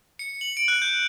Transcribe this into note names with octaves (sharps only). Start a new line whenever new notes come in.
C#7
F#7
D7
F#6
G6